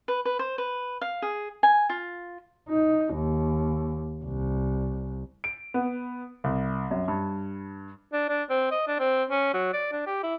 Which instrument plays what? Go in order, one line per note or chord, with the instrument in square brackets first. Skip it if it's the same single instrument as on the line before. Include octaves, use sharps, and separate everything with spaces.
[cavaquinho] B4
B4
C5
B4
F5
G#4
G#5
F4
[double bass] D#4
D#2
C2
[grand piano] D7
B3
C2
F#2
G2
[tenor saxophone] D4
D4
C4
D#5
D4
C4
C#4
F#3
D5
D4
G4
E4